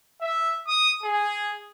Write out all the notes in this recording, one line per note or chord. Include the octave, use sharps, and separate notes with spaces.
E5
D#6
G#4